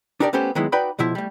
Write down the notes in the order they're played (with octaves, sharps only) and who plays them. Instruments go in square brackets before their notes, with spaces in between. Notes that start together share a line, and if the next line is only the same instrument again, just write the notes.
[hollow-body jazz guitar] D4 D#4 G4 A#4 C#5 D5
A3 B3 C#4 G4 A4 C5
D#3 F#3 G#3 B3 E4
D#4 F#4 B4 D5 G5 B5
C#2 B2 F3 E4 E5
G3 A3